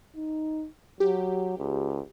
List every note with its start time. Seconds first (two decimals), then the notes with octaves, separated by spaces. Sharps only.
0.16 D#4
1.00 F#3 G4
1.58 C#2